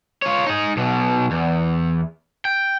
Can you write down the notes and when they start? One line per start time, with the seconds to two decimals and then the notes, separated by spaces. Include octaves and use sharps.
0.22 F4 C#5
0.46 D#4 G#4
0.77 B1 B2
1.31 E2
2.45 G5